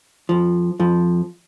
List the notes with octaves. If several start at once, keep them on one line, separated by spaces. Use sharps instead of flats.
F2 F3
F2 F3